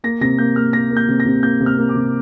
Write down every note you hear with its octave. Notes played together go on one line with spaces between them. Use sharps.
A#3 A#6
C3 A#6
A#3 G6
A#3 F6
A#3 A#6
A#3
G6
C3
A#6
C3
A#3 G6
C3
F6
A#3
D6
C3